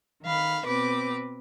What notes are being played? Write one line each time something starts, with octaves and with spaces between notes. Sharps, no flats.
D#3 F5 B5
B2 C4 B4 D6